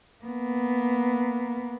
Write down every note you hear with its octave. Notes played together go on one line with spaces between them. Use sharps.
A#3 B3